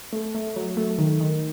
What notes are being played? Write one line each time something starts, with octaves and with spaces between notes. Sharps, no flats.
A3
A3
F#3
A3
D#3
D#3